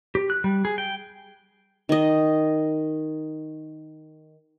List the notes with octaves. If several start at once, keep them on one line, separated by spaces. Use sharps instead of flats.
G4
F#6
G3
G#4
G5
D#3 D#5